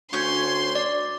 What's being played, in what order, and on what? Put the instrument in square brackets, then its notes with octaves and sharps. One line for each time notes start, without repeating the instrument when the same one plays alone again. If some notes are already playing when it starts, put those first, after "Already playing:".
[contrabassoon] D2 [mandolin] C#4 C#5 G6 [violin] C6
[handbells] D5